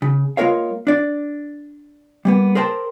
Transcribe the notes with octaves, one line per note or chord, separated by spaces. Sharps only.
C#3
G#3 A#3 F4 A#4 C#5 F5
D4 D5
G3 A#3 B3
G#4 A#4 C5 G5 A5